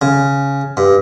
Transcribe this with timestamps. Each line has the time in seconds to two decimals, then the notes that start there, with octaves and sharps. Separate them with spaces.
0.02 C#3
0.77 G2